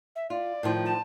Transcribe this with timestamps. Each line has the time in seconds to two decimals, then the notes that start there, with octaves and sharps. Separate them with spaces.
0.16 E5
0.30 F4 D5
0.63 A2 D#3 F3
0.85 A5